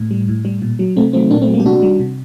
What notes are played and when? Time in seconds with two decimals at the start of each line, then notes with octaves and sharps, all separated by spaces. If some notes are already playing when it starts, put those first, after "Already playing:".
Already playing: A2
0.11 G3
0.28 A2
0.45 G3
0.62 A#2
0.79 F#3
0.96 C3 A3 C4
1.13 D#3 F#3 A3 C4
1.31 A#2 A#3 D4
1.42 A3 C4
1.47 F#3
1.53 G3 A#3
1.60 G4
1.65 C3 D4 F#4
1.82 D#3 G3
2.00 C3